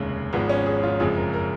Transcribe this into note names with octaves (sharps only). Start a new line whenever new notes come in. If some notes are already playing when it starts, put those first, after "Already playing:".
Already playing: F1 D#2 C#3 G#3
G#1 G#2 F3 G#3 B3
C#4
G#4
F4
F#1 F2 F3 G#3 G#4
A#4
A#4